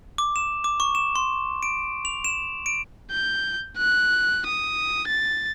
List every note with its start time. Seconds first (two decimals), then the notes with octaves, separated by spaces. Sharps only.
0.18 D6
0.36 E7
0.64 D6
0.80 C#6
0.95 E7
1.16 C6
1.63 D7
2.05 F7
2.24 E7
2.66 D7
3.11 G6
3.77 F#6
4.46 D#6
5.08 A6